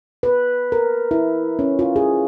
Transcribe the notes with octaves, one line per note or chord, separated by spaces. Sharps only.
B4
A#4
E4
C#4
F4
G#4